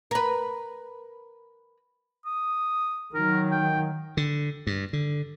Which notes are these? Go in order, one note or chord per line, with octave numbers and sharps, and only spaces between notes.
A#4 B4
D#6
D#3 F#3 A#4
G5
D3
G2
D3